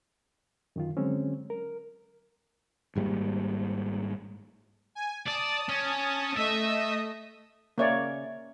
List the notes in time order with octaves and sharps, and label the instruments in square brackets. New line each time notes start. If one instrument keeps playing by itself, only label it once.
[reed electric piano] F#2 D#3 F4
D3 F#3 G#3 C4 C#4
A#4
[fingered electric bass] G#1 G#2 G3 A#3
[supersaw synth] G#5
[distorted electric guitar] D5 [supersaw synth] A5 D#6
[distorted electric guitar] C#4
[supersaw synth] A3 D#5 D#6 [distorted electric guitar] E5
[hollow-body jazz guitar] C#3 E5 [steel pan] A#3 C#5 D5